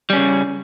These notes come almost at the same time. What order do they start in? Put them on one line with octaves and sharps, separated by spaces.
G3 C#4 C#3